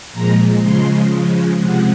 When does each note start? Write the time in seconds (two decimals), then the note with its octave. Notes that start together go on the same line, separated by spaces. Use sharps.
0.13 A#2 F3 G#3 A#5
0.61 C#3 F3 G#3 C6
1.10 C#3 F3 G#3
1.58 C3 F3 G#3 F#5